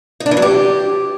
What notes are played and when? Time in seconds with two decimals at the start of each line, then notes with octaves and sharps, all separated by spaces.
0.20 D#4
0.26 D4
0.31 E3
0.37 F#3
0.42 G4